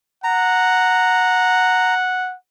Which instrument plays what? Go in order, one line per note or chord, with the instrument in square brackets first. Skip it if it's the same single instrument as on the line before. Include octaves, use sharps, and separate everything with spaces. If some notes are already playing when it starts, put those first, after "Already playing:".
[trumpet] F#5 [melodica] A#5